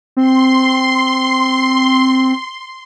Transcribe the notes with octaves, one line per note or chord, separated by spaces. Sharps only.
C4 C6